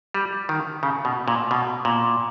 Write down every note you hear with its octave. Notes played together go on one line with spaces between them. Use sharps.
G3
D#3
C#3
B2
A#2
B2
A#2